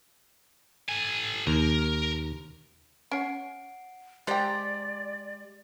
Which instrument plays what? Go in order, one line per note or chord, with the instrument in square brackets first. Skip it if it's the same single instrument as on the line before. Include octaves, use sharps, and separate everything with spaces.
[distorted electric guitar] A4 G#5
[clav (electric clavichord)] D#2 [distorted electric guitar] A#4
[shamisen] C#4 C#5 [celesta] F#5 C7 D7
[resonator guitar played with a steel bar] G#3 G4 A#5 [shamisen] C5 G5 [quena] D5 [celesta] A6